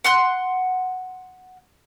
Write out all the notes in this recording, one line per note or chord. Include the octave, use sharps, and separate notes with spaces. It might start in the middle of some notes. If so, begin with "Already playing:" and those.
F#5 C6 F#6